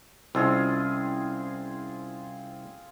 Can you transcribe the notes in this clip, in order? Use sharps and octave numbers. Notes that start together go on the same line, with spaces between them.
C2 C4 C#4 E4 F4 G#4 D#5